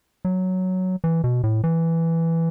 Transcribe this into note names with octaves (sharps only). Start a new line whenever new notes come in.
F#3
E3
B2
A2
E3